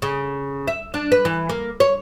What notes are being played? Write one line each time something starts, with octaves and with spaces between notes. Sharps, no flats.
C#3
E5
D4
B4
E3
A#3
C#5